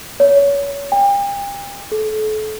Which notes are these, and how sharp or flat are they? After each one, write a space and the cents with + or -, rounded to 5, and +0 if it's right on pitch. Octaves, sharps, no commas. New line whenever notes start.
C#5 +30
G5 +40
A4 -35